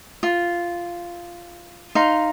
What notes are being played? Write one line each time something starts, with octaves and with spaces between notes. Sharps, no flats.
F4
D#4 F5 C6